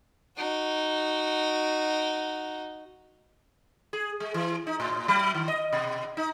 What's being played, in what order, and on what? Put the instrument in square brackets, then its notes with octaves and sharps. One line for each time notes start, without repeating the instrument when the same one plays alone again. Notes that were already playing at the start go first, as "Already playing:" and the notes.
[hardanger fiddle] D#4 F#4
[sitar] G#4
G#3
E3
D#4
A2
F#3
D#3
D#5
B2
D#4